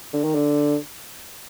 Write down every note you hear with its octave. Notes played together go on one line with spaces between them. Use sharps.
D3
D#3
D3